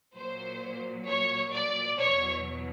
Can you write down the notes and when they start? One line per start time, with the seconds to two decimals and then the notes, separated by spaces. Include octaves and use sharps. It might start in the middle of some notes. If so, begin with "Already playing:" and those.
0.16 A#2 F#3 C5
1.07 C#5
1.54 D5
1.99 E2 B2 F#3 C#5